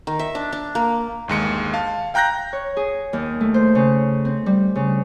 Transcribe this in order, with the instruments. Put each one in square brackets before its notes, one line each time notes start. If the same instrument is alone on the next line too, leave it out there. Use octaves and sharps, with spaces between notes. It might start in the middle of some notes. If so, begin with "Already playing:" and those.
[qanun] D#3
E5
D4
D4
A#3
[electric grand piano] G1 D#2 G#3 C#7
F5 A5
F5 G5 A#5 F#6 G6 A#6
[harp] C#5
G#4
D#2
A3
C5
C#3
C4
G3
C#3